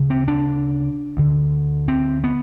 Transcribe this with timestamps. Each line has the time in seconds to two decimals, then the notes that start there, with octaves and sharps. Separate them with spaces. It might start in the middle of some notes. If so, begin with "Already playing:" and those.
Already playing: D2 C#3
0.10 C4
0.28 D4
1.17 D2 D3
1.88 C4
2.24 B3